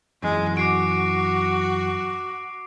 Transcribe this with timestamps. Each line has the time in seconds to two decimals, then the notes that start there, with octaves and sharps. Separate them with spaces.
0.23 F#2 E3 G#3
0.57 F#4 D6 C7 D7